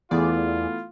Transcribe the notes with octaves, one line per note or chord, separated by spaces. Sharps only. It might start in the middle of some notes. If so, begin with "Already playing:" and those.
E2 E3 A3 B3 F4 G#4 D5